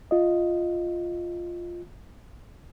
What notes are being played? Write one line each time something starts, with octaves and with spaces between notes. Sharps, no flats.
F4 D#5